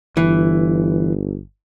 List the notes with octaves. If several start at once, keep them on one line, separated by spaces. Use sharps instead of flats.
G1 E3